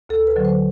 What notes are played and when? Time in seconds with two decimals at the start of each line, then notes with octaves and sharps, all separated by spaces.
0.09 D2 A4
0.27 B4
0.36 D3 F#3
0.45 C5